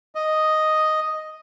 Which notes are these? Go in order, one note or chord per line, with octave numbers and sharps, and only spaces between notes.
D#5